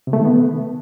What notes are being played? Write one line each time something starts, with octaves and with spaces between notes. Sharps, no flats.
C3
A3
D#3
B3